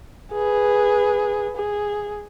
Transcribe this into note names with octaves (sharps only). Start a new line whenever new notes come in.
G#4 B4
G#4